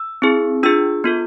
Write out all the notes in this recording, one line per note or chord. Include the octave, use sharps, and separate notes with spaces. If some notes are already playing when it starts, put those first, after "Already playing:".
Already playing: E6
C4 E4 G#4
D4 F4 G#4 E6
B3 F4 A4